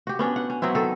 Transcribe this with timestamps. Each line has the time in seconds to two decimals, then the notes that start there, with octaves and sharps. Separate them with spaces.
0.07 F#4 G4
0.19 B3 C#4 D4
0.36 F#5
0.50 C#4
0.62 F#3 B3 C4 E4
0.75 D#3 A4